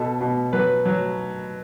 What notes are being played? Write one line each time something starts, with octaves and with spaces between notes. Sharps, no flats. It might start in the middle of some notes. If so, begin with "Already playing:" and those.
Already playing: B2 A4
B2
F#3 B4
F#3